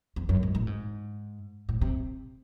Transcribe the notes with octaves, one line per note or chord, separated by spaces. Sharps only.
E2
F#2
G#2
A2
G#2
A2
C3